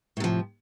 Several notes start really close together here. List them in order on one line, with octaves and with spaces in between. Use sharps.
A2 C3 F3